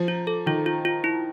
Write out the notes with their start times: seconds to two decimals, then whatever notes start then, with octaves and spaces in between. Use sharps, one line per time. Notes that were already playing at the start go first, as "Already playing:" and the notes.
Already playing: F3
0.08 F4
0.27 A4
0.46 D#3 F4
0.66 F4
0.85 F4
1.04 E4